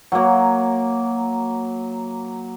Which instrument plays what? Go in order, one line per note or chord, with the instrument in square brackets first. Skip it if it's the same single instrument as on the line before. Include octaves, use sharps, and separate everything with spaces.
[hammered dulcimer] F#3 A#3